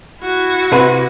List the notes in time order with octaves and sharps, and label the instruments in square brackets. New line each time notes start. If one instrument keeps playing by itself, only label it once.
[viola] E4 F#4
[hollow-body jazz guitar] C3 B4 F#5